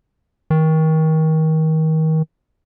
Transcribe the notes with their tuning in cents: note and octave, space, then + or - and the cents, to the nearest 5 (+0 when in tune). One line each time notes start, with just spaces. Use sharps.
D#3 +30